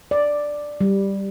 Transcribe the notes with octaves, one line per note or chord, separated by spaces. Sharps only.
D5
G3